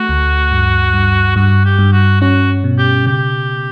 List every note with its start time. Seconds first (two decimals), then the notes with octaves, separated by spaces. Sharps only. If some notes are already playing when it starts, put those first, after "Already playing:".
Already playing: A3 F#4
0.09 D2
0.52 G2
0.93 G2
1.36 G2 F#4
1.65 G4
1.79 G2
1.93 F#4
2.21 C#4 F#4
2.64 B2
2.78 G4
3.06 C#3 G4